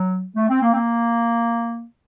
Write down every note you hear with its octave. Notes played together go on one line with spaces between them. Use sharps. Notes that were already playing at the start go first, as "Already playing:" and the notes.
Already playing: F#3
A3
C4
A#3
C4
A#3